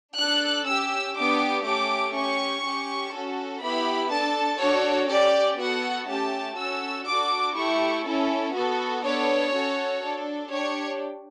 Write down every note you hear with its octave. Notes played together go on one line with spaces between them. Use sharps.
D4 A4 F#6
C#4 G4 E6
B3 D4 G4 D6
A3 C#4 G4 D6
C#4 G4 C#6
C#4 G4
C#4 F#4 A4
B3 E4 G4 B5
D4 A4 A5
D4 F#4 A4 C#5
C#4 G4 D5
B3 F#4 A4 F#5
A3 C#4 G4 A5
C#4 F#4 A4 E6
D4 F#4 A4 D6
A3 E4 G4 C#6
C#4 E4 A4
B3 F#4 A4
B3 D4 A4 C#5
C#4 F#4 A4
D4 A4
D4 G4 C#5